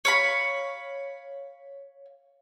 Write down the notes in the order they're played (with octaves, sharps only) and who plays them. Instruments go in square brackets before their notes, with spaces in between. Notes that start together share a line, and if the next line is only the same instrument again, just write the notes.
[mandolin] C#5 F5 B5